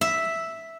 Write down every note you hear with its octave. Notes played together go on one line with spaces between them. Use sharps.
E5